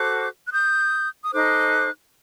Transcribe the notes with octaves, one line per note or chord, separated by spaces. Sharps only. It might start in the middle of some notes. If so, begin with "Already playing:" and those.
Already playing: F#4 A4 C5 D6 F#6
F#6
D#6 G6
D#6
D#4 A4 C5 D6 F#6